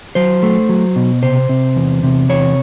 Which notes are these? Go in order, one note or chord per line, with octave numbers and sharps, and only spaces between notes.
F#3 C5
A3
F#3
B2
C3 C5
C3
E2
C3
E2 C#5